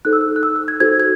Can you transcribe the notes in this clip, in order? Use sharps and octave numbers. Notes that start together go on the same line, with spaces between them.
D#4 A4 C5 F#6
E6
F#6
F#6
E6
E6
G#6
D#4 F#4 A4 C5 G#6
G#6